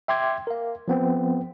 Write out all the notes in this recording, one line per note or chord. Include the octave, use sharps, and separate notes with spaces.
E5 G5 C6 D6 G#6
A#4 F5
F3 B3 C4